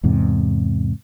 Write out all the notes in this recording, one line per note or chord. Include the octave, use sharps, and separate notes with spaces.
E2 G#2 C3